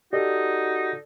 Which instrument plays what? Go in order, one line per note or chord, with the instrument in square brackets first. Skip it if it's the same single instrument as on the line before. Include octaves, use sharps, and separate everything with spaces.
[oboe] D#4 [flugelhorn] F#4 [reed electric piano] G4 D#5 [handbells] A4 D5